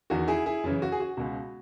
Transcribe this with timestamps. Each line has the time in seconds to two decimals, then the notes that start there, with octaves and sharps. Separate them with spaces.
0.10 E2 D#3 F#4
0.28 E4 G#4
0.46 E4 G#4
0.64 F#2 C#3 E3 E4
0.82 F#4
0.92 G#4
1.00 F#4
1.17 C#2 B2 F#4